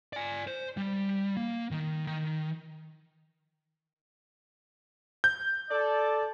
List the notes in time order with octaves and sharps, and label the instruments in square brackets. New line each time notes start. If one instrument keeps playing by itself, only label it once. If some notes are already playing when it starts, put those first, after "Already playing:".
[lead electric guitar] D5 G#5
C5
G3
A#3
D#3
D#3
[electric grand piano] G6
[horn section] A4 D5